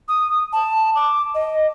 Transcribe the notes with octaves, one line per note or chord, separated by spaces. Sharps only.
D#6
A5
D6
D#5